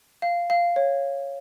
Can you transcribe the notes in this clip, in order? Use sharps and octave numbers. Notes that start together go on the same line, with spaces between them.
F5
F5
C#5